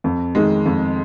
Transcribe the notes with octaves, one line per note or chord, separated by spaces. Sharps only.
F2
D#3 G#3
F2